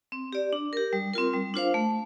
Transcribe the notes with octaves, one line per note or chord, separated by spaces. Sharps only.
C4
G4 D5
D4
G4 A#4
G3
C4 F4 A#4
G3
D4 F4 C5 F5
A3